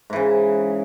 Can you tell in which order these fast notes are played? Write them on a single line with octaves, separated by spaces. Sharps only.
G#2 E3 C#3